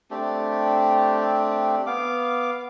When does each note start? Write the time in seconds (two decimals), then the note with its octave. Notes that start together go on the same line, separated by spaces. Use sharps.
0.11 A3 C4 D4 G4
1.87 B3 F5 D6